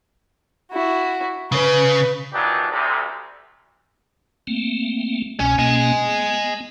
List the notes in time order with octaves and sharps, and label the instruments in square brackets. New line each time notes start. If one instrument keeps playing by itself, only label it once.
[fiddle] E4 F#4
[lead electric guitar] C#3 [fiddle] B4
[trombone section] A#2 E3 F#3 D4 D#4 G4
D2 C3
[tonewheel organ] A3 A#3 C4
[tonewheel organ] C2 B2 [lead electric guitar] C#4
[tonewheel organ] B2 A#3 C#4 [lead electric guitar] D#5 G#5
[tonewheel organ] B3